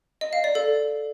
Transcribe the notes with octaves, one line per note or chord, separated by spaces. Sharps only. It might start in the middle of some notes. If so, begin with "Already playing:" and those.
D#5
F5
D5
A4